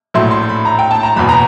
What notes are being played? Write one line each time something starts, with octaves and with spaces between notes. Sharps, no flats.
A#1 A2 F#3 A3 C6
C6
B5
A#5
G5
A5
A#5
F#1 E2 B2 B5
A#5